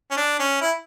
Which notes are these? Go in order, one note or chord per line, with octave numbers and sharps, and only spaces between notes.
C#4
D4
C#4
E4